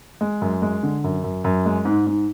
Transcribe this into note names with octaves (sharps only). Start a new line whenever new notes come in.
G#3
F#2
G#3
D3
F#2
F#2
F#2
G#3
G#2
G#2